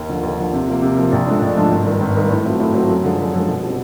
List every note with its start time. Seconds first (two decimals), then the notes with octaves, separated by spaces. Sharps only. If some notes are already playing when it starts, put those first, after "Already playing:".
Already playing: D#2
0.09 D3 F3
0.23 D#2
0.38 D3 F3
0.53 C3
0.68 F3 A#3
0.82 C3
0.97 F3 A#3
1.12 A#1
1.26 G#2 F3 A3 D4
1.41 A#1
1.56 G#2 F3 A3 D4
1.71 G#1
1.86 G2 D#3
2.01 G#1
2.16 G2 D#3
2.30 A2
2.45 F#3 A3 C4 F4
2.60 A2
2.74 F#3 A3 C4 F4
2.89 F#2
3.03 D3 F3 G#3
3.19 F#2
3.34 D3 F3 G#3
3.48 B2
3.63 G3 C4